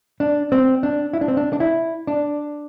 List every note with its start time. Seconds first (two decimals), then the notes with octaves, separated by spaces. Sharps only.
0.20 D4
0.52 C4
0.83 D4
1.13 E4
1.21 D4
1.28 C4
1.37 D4
1.53 D4
1.60 E4
2.07 D4